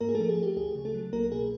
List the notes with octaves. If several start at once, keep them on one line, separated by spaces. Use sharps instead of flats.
G#2 A#3 A#4
G#4
F3 A3 A4
G#4
A3 G4
D2 G#4
C#3
A3 A4
F#3
C2 A#3 A#4
B2 G#4